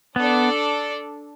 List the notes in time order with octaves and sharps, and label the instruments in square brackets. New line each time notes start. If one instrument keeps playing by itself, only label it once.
[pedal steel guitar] B3 [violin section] D4 A4 D5